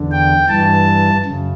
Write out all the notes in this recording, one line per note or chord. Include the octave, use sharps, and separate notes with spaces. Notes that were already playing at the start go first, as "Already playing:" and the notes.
Already playing: E2 D3
G5
G2 E3 A5
F#2 C#3